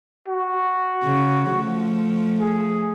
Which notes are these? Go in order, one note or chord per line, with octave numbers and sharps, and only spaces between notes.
F#4
C#3
F3 A3
G#4